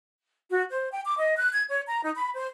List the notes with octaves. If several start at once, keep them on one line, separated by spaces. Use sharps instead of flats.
F#4
C5
G5
D6
D#5
F#6
G#6
C#5
A#5
D#4
B5
C5